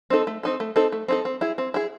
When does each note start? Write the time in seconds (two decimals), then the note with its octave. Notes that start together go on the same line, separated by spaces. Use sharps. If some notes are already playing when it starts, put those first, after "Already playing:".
0.10 C4 D#4 A4
0.27 A3
0.43 C4 D#4 A4
0.60 A3
0.76 C4 D#4 A4
0.92 A3
1.08 C4 D#4 A4
1.25 C4
1.41 E4 G#4
1.58 C4
1.74 E4 G#4